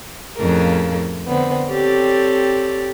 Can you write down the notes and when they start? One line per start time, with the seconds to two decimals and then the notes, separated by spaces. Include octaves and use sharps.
0.36 F2 A2 C#3 A4 A#4
1.26 D3 B3 C4
1.70 C4 G4 A4 C#5 D5